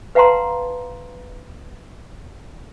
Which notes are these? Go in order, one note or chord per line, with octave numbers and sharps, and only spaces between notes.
B4 F5 F#5 A5 A#5 C6